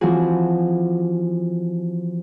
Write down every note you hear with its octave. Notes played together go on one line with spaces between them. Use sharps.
E3 F3 C4 F#4 G#4